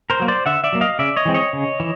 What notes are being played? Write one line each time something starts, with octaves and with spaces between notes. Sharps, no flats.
A#4 C5
F#3 A#3
C5 D5
D3 E5 F#5
D5 E5
F#3 A#3
D#5 F5
C#3 D5 E5
C#5 D#5
E3 G#3 C4
C#5 D#5
C#3
E3